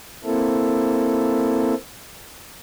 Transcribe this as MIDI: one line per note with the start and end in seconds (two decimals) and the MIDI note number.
0.24 1.74 58
0.24 1.74 60
0.24 1.74 64
0.24 1.74 69